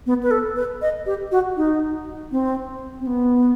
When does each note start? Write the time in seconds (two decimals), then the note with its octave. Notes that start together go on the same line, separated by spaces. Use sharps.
0.06 B3
0.23 B4
0.31 A4
0.56 B4
0.82 D#5
1.06 G4
1.32 F#4
1.57 D#4
2.32 C4
3.00 C4
3.07 B3